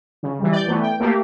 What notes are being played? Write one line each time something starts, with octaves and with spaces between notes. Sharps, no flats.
C#3
E3 G3
D5 G6
E3 A3 B3
G5
A3 A#3 G4